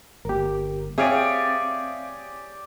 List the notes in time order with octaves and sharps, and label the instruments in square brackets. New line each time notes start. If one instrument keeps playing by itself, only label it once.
[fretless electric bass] G1 A#3 [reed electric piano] G4 A#4
[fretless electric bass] C4 [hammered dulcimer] G4 D5 [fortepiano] G#4 C#5 [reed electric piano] E5 F5 D#6